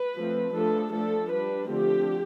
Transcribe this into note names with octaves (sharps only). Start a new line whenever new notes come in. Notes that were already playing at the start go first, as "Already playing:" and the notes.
Already playing: B4
F3 A3 C4
F3 A3 D4 A4
F3 A3 D4 A4
G3 D4 B4
D3 F3 A3 C4 G4